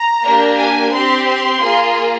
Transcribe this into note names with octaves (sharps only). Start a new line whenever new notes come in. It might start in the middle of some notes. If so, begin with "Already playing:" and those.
Already playing: A#5
A#3 D4 G4
G#5
C4 G4 C6
C6
A#3 F4 G#4